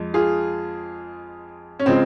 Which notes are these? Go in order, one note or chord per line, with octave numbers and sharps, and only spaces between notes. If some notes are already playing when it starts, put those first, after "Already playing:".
Already playing: F2 G#3
F4 G#4
C#4
C#3 F3 G#3 C4